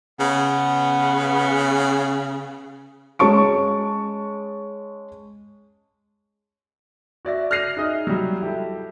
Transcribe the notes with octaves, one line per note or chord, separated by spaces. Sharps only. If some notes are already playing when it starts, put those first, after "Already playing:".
C#3 B3
G#3 C#4 A5 C#6 D7
F#4 D5 E5 A#6
F6 F#6 A#6 C7 D#7 F7
D#4 G#4 D#5 E5
F#3 G3
E4 G4 A4